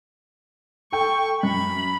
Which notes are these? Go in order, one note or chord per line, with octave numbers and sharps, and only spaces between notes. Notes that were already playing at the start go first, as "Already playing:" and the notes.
A4 G5 C#6
F#2 B5